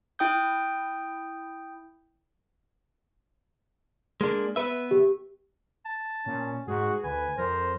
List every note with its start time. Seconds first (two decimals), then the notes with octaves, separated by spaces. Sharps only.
0.19 E4 G5 D#6 G6
4.21 G#3 A#3 D4
4.56 B3 B4 E5
4.91 G4
5.85 A5
6.26 A#2 C#4
6.67 G#2 F#4 G#4
7.04 D2 B4 G#5
7.38 F2 A#4 C5